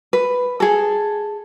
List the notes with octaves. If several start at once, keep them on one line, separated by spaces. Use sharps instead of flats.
B4
G#4 A4